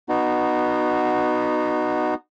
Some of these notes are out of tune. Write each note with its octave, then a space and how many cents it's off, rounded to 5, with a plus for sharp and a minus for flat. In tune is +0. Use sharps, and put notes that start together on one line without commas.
B3 +0 D#4 -25 F#4 +0